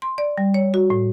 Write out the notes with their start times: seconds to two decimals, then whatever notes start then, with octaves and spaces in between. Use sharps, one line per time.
0.02 C6
0.18 D5
0.38 G3
0.54 C#5
0.74 F#4
0.90 A2